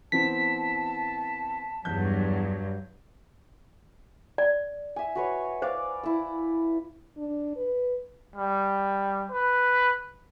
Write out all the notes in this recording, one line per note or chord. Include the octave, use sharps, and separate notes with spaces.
E3 B3 C4 A5 B6
E2 G2 F#3 G6
D5
E5 G#5
F#4 B4 C#5
C5 D5 F5
E4 E6
D4
B4
G3
B4